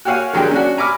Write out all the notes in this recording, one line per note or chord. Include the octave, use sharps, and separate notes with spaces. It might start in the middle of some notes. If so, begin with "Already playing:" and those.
F#4 G4 C#5 F5 F#5 G#5
D3 F#3 G#3 G4 A#4
C#4 D4 F#4
G#5 A#5 B5 D6 F6